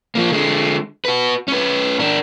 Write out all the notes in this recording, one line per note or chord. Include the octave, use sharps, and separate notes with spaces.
F3 A#3
D3 G#3
F#4 B4
C#4 B4
D4 A#4